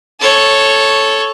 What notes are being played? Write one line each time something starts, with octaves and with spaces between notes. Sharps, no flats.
A4 C#5